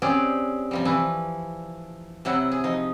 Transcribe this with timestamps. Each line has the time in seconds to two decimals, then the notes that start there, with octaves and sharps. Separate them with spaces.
0.02 C4 C#4 G4 G#4 D5
0.71 C3 F3 G3
0.85 E3 F3 E4 B4
2.25 C3 F#3 E4 F#5
2.52 G#4
2.64 F3 D#4